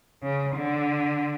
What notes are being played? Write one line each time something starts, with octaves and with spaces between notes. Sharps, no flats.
C#3
D3